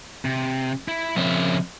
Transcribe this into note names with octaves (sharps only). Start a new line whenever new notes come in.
C3
E4
C#3 F3 C4 C#5 E5